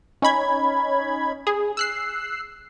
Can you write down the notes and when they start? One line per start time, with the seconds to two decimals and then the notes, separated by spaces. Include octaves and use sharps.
0.22 C#4 D#4 B5 G#6
1.47 G#4
1.77 E6 F#6 C7